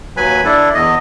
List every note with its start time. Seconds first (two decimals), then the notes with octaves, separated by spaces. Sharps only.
0.17 D#2 F#3 B4 G#5 B5
0.45 D4 E4 A4
0.74 E2 D#5